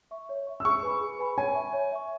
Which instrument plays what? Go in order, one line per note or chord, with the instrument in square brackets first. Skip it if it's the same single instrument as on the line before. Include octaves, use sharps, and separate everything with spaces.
[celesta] E5 C#6
C#5
E5 C#6
[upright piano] E6
[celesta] G#4 [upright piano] C#6
[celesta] B4 G#5 B5
G#4
B4 G#5 B5
[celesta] C#5 [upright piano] G#5
[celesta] E5 C#6
C#5
E5 C#6